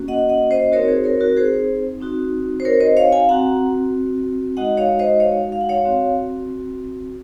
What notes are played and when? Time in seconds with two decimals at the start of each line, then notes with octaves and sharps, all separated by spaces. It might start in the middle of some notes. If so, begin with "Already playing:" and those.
Already playing: A#3 C#4 F#4
0.08 D#5 F#5
0.29 D#5 F#5
0.51 C5 D#5
0.72 C4 D#4 F#4 A#4 C#5
0.88 G#4 C5
1.04 A#4 C#5
1.20 F#4 A#4
1.37 G#4 C5
2.01 C4 D#4 F#4
2.60 C5
2.65 A#4 C#5
2.80 C5 D#5
2.97 C#5 F5
3.12 F5 G#5
3.29 C4 F#4 F#5 A#5
4.57 G#3 D#4 F#4 D#5 F#5
4.77 C#5 F5
4.99 C5 D#5
5.20 C#5 F5
5.52 F5
5.61 F#5
5.69 C#5 F5
5.85 C4 F#4